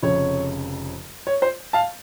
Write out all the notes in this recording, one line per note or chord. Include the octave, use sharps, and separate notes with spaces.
F1 F2 C#3 C#5
C#5
C5
F5 A5